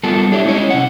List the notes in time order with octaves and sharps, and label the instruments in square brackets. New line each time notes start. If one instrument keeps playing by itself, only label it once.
[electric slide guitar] G3 B3 F4 A4 A#4 A5
D4 E4 G4 A4 C#5 E5
G#3 C#4 E4 C#5 D#5
C3 G#3 F#5